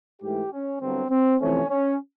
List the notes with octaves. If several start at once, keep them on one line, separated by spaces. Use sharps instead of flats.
G#2 E3 A3 G4
C#4
G1 G2 D3 F#3 C4
C4
F2 C3 E3 A3 C4 C#4
C#4